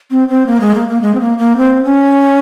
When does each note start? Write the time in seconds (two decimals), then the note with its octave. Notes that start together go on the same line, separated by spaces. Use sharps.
0.11 C4
0.28 C4
0.47 A#3
0.60 G#3
0.75 A#3
0.88 A#3
1.01 G#3
1.15 C4
1.20 A#3
1.38 A#3
1.57 C4
1.84 C#4